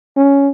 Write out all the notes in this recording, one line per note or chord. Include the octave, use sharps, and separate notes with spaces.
C#4